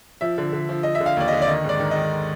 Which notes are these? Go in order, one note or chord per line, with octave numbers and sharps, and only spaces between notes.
F3 E5
D3
D3
F3
F3 D#5
E5
D3
F5
D#2 D5
D3 D#5
D5
D#3 D#5
G#2 D5
D#3
D#3 D#5